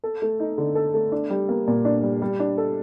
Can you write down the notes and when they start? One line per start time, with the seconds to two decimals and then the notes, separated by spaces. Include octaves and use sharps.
0.04 A4
0.22 A3
0.40 D#4
0.58 D3
0.75 A4
0.94 A3
1.12 D4
1.30 G3
1.49 A#3
1.67 A#2
1.85 D4
2.03 G3
2.22 G3
2.40 D4
2.58 A4